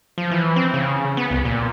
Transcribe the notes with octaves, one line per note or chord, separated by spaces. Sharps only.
F3
E3
C4
C#3
B3
C2
A#2